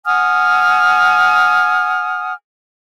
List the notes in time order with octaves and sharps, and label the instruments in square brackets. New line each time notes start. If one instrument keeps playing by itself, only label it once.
[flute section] F#5 G#5 D#6 F6